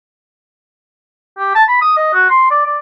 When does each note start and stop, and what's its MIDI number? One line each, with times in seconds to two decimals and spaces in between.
1.38 1.53 67
1.55 1.64 81
1.68 1.79 83
1.81 1.94 87
1.97 2.13 75
2.14 2.28 66
2.30 2.49 84
2.50 2.64 74
2.65 2.77 74